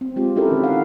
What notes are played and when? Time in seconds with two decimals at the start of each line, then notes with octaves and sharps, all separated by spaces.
0.01 C4
0.16 G#3 F4 G4
0.36 C4 C#4 E4 G4 A4 A#4
0.51 D#3
0.64 F5 F#5